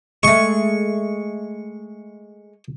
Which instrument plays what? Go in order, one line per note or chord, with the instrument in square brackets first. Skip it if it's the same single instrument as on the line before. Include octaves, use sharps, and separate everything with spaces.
[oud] G#3 A3 [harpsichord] C#6